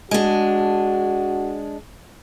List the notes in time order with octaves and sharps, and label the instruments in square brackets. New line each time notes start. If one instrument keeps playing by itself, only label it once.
[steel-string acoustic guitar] G#3 D4 [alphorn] F#4